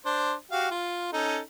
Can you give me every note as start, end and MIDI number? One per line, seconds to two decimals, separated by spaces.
0.06 0.33 62
0.06 0.33 72
0.51 0.68 66
0.51 0.68 67
0.51 0.68 77
0.71 1.11 65
1.13 1.39 61
1.13 1.39 63
1.13 1.39 69